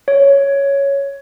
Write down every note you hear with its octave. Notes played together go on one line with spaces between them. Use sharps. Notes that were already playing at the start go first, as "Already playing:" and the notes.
C#5